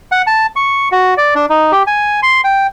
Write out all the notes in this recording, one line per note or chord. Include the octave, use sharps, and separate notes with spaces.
F#5
A5
C#6
F#4
D5
D4
D#4
G4
G#5
C6
G5